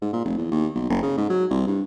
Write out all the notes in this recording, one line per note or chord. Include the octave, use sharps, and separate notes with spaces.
G#2
A#2
F1
E2
D#2
B1
F#1
C#3
G#2
F#3
C2
G2